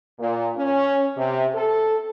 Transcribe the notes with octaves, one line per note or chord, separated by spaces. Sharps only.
A#2
C#4
C3
A4